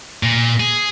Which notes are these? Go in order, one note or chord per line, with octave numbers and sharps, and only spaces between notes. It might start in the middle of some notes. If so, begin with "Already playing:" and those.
A#2
G#4